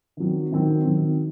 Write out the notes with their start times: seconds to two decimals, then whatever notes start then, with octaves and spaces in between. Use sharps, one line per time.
0.17 D#3 F#3 C4
0.52 D#3 F#3 C4
0.85 D#3 F#3 C4